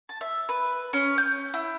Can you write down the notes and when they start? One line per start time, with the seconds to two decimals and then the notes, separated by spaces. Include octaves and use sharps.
0.09 A5
0.21 E5
0.49 B4
0.93 C#4
1.18 G6
1.54 E4